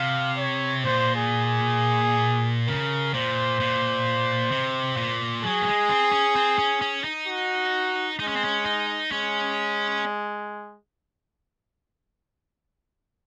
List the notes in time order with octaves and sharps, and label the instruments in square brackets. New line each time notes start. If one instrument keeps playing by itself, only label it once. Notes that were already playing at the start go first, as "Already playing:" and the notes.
Already playing: [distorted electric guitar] C3 [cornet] F5
[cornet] C#5
[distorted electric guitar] A#2 [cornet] C5
[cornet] G#4
G#4
[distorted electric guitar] C#3 [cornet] A#4
[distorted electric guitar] A#2 [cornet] C5
[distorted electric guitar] A#2
C3
A#2
[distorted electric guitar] F#3 [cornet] G#4
[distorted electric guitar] A#3
G#3
C4
C#4
C4
C#4
C#4
D#4
[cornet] F#4
[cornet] G#3 [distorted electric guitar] D#4
[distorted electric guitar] C#4
C4
C#4
D#4
[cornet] G#3 [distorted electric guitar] C#4